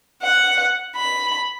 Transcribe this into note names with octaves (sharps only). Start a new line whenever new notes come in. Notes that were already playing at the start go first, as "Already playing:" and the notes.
F#5
B5